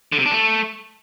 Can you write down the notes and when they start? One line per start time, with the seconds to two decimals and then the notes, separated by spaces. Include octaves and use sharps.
0.12 D3
0.19 C3
0.26 D4
0.32 A3